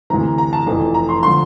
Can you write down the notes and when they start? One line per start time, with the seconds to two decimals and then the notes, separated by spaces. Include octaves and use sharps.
0.10 D2 C3 E3 A#5
0.38 A#5
0.53 A5
0.66 F1 F2 E3 A5
0.94 A#5
1.09 C6
1.23 D3 F3 C6